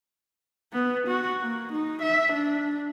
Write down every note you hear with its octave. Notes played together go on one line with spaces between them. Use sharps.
B3
F#4
A#3
D#4
E5
D4